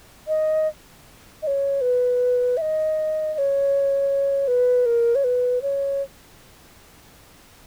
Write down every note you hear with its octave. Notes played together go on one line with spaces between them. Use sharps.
D#5
D#5
C#5
B4
E5
D#5
D#5
C#5
B4
A#4
C#5
B4
C#5